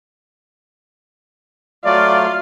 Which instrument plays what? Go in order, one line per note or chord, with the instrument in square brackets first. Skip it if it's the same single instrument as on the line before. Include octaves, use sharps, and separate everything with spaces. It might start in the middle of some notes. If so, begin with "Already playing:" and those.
[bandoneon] F#3 A3 [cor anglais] F4 [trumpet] D5 [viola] F5